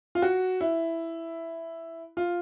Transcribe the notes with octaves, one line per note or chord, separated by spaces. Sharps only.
F4
F#4
E4
F4